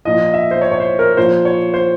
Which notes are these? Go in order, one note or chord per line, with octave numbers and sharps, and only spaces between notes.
A#2 F3 D#5
E5
C5
C#5
C#5
C5
A#4
A#2 F3 C5
C#5
C5